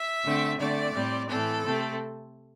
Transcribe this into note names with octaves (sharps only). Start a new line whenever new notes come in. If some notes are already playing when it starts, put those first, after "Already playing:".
Already playing: E5
D3 A3 C4
D3 A3 C4 D5
A2 G3 C4
A2 E3 C4 A4
C3 A3 C4